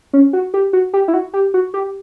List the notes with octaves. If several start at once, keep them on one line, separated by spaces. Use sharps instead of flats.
C#4
F#4
G4
F#4
G4
E4
F#4
G4
F#4
G4